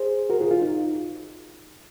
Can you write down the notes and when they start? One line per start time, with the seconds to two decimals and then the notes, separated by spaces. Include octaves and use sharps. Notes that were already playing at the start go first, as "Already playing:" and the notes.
Already playing: G#4 C5
0.30 F#4 A#4
0.41 F4 G#4
0.51 F4
0.61 D#4